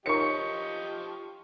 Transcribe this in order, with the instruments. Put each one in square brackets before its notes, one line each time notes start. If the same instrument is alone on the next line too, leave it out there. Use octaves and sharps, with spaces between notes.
[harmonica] F3 G4 D#5 [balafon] D#4 A#4 C#5 [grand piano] C#6 C#7